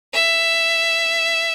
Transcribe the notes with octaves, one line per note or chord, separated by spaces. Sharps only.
E5